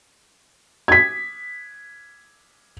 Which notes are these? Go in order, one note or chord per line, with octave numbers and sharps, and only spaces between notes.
G#6 B6